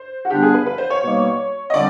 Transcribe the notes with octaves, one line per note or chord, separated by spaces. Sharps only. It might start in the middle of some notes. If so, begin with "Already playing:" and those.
Already playing: C5
F#4
D3 G3 B3 D4 G4
G#4
B4
B4
C5
C#5
B2 G3 A#3 D#4
D#5
D3 G3 C4 D5